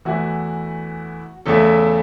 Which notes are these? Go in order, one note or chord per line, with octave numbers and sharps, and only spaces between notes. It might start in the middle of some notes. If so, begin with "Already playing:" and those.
E2 E3 A3 E4 F#4
E2 C#3 A3 E4 A4